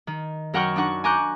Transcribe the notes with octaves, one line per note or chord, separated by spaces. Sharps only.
D#3
F#2 A#4 F#5 G5 C#6 F6
D4 D#4 F#5 C#6
G#5 A#5 C#6 D6 F#6 G6